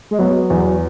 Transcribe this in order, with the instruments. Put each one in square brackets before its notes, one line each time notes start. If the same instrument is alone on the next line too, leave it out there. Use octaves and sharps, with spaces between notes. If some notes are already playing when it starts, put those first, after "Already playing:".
[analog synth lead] G#3
[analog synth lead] F#3 [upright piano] B3
[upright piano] E2